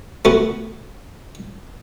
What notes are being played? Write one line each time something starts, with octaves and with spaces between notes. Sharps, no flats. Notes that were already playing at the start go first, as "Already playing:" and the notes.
A3 B3 F#4